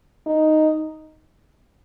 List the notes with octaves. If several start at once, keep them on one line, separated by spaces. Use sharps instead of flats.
D#4